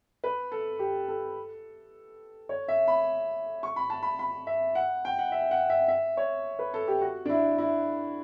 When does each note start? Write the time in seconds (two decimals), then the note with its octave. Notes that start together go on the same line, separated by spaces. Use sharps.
0.24 B4
0.52 A4
0.79 G4
1.08 A4
2.49 C#5
2.68 E5
2.87 B5
3.63 C#6
3.76 B5
3.90 A5
4.03 B5
4.19 B5
4.47 E5
4.75 F#5
5.05 G5
5.19 F#5
5.32 E5
5.51 F#5
5.70 E5
5.88 E5
6.17 C#5
6.59 B4
6.74 A4
6.88 G4
7.01 F#4
7.25 D4
7.29 E4
7.58 E4